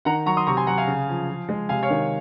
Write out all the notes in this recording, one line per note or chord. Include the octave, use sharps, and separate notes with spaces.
D#3 F#5 A#5
F#3 A#5 C#6
C6 D#6
C3 A#5 C#6
G#5 C6
F#3 F#5 A#5
F5 G#5
C#3
F3
F3
G#3
C3 F5 G#5
C#5 F5
D#3